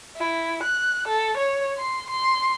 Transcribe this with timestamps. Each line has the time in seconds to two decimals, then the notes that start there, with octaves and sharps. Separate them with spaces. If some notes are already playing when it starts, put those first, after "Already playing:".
0.17 E4
0.63 F#6
1.08 A4
1.37 C#5
1.78 C6
2.10 C6